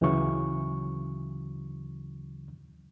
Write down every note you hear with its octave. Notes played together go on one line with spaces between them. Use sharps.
D2 C#3 E3 F#3 C#6